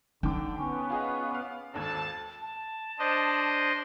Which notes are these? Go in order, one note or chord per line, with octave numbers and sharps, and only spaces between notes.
D3 D#4 G5 D6
B3 C#4
F4 G#4 D#5
F5 D6
G#1 D#2 A4 A5 G#6
A5
D4 C5 D#5